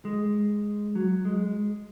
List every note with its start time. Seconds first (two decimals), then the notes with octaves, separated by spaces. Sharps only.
0.05 G#3
0.95 F#3
1.25 G#3